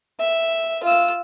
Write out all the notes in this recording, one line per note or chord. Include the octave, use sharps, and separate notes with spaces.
E5
F4 E6